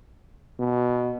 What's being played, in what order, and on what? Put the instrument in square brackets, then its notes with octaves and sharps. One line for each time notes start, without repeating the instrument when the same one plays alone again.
[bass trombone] B2